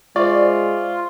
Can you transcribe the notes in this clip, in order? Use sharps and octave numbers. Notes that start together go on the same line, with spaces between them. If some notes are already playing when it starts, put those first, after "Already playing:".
G#3 F4 C5 D5 E5 C#6